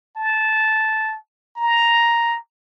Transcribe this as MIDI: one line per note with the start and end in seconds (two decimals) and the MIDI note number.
0.17 1.16 81
1.57 2.37 82